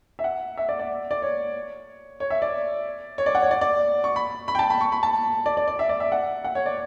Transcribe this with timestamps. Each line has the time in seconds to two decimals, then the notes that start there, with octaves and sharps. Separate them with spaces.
0.19 E5
0.24 F#5
0.57 E5
0.69 D5
0.79 D5
1.11 D5
1.22 C#5
2.20 C#5
2.30 E5
2.42 D5
3.18 C#5
3.26 D5
3.35 F#5
3.42 C#5
3.51 D5
3.61 D5
4.04 C#6
4.16 B5
4.48 B5
4.55 G5
4.59 A5
4.70 B5
4.81 C#6
4.92 B5
5.03 A5
5.46 D5
5.57 D5
5.68 D5
5.79 E5
5.89 D5
6.00 E5
6.12 F#5
6.44 F#5
6.55 C#5
6.66 D5